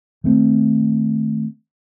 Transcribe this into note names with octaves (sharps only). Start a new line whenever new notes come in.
D#3 A3 C4